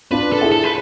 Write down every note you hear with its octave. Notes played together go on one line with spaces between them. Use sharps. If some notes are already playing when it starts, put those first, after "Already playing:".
D4 F4 B4
A4
E4 G#4
A4
B4